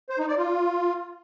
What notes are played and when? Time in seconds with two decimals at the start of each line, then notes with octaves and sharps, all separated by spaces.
0.09 C5
0.19 D#4
0.28 D5
0.37 F4